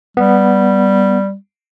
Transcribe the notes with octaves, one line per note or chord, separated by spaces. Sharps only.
G3 B3